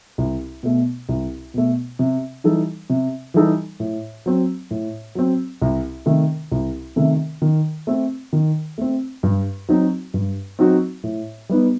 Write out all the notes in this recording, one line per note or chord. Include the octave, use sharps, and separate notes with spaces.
C2
B2 A3
C2
B2 A3
C3
E3 G3 D#4 A4
C3
E3 G3 D#4 A4
A2
F#3 C4
A2
F#3 C4
C2
C3 D#3 A3
C2
C3 D#3 A3
D#3
A3 C4
D#3
A3 C4
G2
F#3 C4 D#4 F#4
G2
F#3 C4 D#4 F#4
A2
G3 B3 D#4